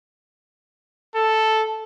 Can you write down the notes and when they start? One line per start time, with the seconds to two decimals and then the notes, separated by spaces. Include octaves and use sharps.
1.15 A4